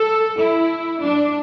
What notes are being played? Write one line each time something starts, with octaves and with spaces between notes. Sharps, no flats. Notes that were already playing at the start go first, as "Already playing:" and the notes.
Already playing: A4
E4
D4